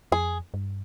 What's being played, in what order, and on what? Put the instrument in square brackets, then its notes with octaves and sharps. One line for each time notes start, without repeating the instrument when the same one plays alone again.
[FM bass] F2 [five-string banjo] G#4
[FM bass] G2